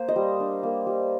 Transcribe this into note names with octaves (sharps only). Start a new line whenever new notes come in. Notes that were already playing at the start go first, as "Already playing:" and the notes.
Already playing: A#3 C5
D#5
G3
D4
A#3
G3